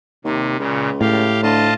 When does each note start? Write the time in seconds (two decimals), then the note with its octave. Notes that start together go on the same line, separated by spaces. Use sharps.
0.25 D#2 C3
0.59 C#2 A#2 C#3
1.01 A2 G4 F5
1.43 D2 F4 D#5 A5